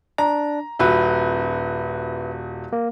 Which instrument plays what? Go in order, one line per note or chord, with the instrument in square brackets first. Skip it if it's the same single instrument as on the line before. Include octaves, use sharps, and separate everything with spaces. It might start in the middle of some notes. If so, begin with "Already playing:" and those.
[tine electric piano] D4 [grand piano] A#5
[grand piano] D#1 F#4 [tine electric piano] B4 E5
[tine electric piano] A#3